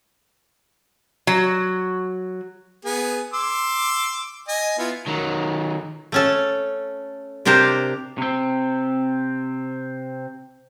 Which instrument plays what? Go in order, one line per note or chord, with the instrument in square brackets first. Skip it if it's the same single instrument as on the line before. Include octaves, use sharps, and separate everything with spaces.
[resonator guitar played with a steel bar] F#3
[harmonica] B3 G#4
C6 D6 E6
D#5 G#5
B3 E4 F4
[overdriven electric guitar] D#3 F#3
[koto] A3 C#4 A4
C3 D4 G4 A#4 C5
[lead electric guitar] C3 C4